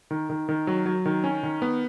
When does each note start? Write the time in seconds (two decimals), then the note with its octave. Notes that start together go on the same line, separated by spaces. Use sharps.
0.11 D#3
0.30 D#3
0.49 D#3
0.67 F#3
0.86 F#3
1.06 D#3
1.24 C#4
1.43 D#3
1.62 B3